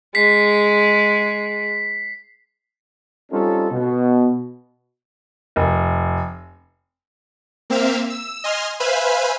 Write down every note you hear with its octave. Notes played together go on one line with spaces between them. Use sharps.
G#3 B6 C7
G3 C4 C#4 D#4 F4 A4
B2
F1
A#3 C4 E5 F5
E6
D#5 G#5 C6 F6
B4 C5 E5 F5 G#5 B5